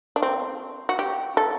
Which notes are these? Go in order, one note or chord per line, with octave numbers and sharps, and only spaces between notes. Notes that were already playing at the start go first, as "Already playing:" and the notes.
D4
C4
F#4
G4
A4